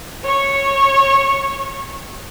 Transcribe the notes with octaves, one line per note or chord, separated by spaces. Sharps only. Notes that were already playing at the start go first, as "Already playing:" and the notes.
C#5 C#6